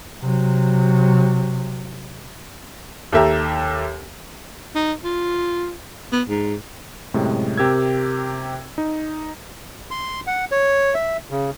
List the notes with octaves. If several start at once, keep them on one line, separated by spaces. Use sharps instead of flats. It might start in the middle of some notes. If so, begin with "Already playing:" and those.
C3 F#3
D#2 G4 A4 E5 G5 A#5
D#4
F4
B3
G#2
F#2 A2 C3 G#3
C3 G4 A#4 E6 G#6
D#4
C6
F#5
C#5
E5
C#3